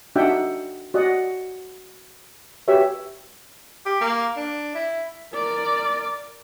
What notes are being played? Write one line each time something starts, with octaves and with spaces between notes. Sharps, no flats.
D4 D#4 F#4 E5 F#5 G5
F#4 D5 D#5 F#5
F#4 G4 B4 C#5 E5
G4
A#3
D4
E4
A#4 D5